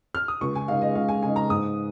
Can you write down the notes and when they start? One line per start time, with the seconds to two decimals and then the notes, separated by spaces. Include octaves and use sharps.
0.15 F6
0.28 D#6
0.41 C#2 C#6
0.55 G#5
0.68 C#3 G#3 D#4 F5
0.82 D#5
0.95 C#2 F5
1.09 G#5
1.23 C#3 G#3 D#4 G#5
1.36 A#5
1.49 G#2 D#6